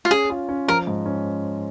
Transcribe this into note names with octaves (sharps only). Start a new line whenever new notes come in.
F4
C#4 G#4
F4
C#4
F3 A#4
G#2
C#4